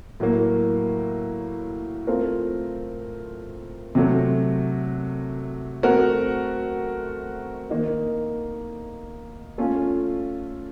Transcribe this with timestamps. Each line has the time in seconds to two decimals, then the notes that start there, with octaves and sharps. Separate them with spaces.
0.20 A2 F#3 A#3
2.07 A3 C4 F4 A#4
3.95 C3 F#3 A3
5.83 A3 C4 F#4 A#4
7.70 D#3 A#3 D#4
9.58 A3 C#4 F4 A4